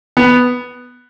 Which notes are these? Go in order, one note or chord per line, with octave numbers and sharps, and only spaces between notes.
B3